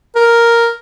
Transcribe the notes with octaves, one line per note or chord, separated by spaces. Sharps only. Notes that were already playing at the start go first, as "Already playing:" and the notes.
A#4